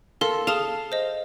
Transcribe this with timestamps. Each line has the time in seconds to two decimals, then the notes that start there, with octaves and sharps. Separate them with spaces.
0.21 A4 A#4 F5 C6
0.47 G#4 F5 A5 D#6
0.92 C5 D#5